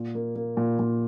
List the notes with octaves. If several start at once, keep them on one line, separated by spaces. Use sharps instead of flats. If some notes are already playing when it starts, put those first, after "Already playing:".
Already playing: A#2
A#3
A#3
A#2
A#2